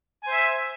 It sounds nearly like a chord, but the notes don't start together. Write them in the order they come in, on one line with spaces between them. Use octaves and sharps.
G#5 C5 E5